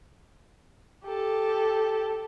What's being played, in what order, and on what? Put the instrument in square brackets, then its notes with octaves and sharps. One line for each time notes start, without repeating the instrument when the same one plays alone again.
[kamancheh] G4 A4